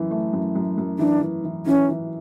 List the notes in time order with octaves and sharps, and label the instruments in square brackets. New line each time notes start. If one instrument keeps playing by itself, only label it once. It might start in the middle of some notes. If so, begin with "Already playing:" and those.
Already playing: [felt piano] F#2 E3
A3
F#2
F#2
F#2
[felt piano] E3 [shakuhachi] D4
[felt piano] E3
E3
[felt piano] E3 [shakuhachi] C#4
[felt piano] E3